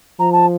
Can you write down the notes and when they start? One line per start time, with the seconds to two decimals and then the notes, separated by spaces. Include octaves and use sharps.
0.19 F3 A#5
0.32 A5